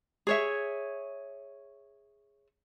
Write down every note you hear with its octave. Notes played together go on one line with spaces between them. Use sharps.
G#4 C#5 E5